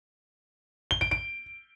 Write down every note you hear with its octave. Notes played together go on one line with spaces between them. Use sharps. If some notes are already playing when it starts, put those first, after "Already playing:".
G7
D7
D7